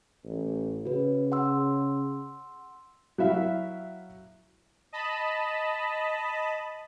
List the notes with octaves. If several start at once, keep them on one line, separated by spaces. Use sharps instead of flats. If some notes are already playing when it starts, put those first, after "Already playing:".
A1
C#3 F#4 B4
F#5 C6 E6
F#3 E4 E5 F5
D#5 A5 B5